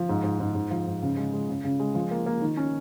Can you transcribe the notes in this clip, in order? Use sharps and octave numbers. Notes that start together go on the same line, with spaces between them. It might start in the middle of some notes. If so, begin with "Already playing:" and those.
Already playing: F3
G#2
G#2
G#2
G#2
F3
G#2
C#3
G#3
G#3
C#3
C#3
G#3
F3
A#3
A#3
D#3
C#4